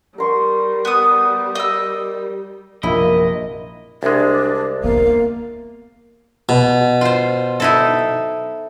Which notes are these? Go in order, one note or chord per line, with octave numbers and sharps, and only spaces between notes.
G3 A#4 C6 C#6
B3 D#6
D#5 E6
A#1 F#2 C3 E4 F4 A#4 D#5
C2 G#3 D4
A#3 B3 F5
B2
F4 C5
D#4 E4 A4